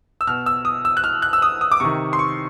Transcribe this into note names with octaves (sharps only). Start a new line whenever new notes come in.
E6
B2 F6
E6
D#6
E6
F#6
F6
F#6
E6
D#6
D#6
D6
C3 D#3 C#6
C6
C#6